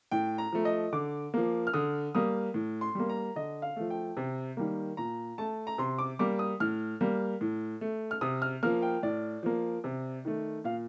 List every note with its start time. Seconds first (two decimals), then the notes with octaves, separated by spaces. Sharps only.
0.11 A2 G5
0.38 A#5
0.52 F3 A3
0.65 D#5
0.92 D3 D6
1.34 F3 A#3
1.67 F6
1.74 D3 D#6
2.15 G3 A#3 D#6
2.54 A2
2.81 C6
2.95 G3 A#3
3.09 A#5
3.36 D3 D#5
3.62 F5
3.76 F3 A3
3.90 G5
4.17 C3
4.57 D#3 G3 A#3
4.97 A#2 A#5
5.38 A3 A5
5.67 A#5
5.78 C3 C6
5.99 D6
6.19 G3 A#3 D6
6.39 D#6
6.60 A2 F6
7.01 G3 A#3
7.41 A2
7.81 A3
8.11 F6
8.21 C3 D#6
8.42 F6
8.63 F3 A#3 F6
8.82 G5
9.03 A2 D5
9.43 F3 A#3
9.84 C3
10.25 D#3 A3
10.64 A#2 F5